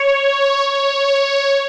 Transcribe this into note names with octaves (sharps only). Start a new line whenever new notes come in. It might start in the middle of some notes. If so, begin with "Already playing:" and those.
Already playing: C#5
C#5